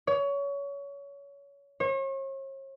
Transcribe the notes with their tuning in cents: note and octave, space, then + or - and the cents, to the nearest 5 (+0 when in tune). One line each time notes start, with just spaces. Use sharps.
C#5 +25
C#5 -40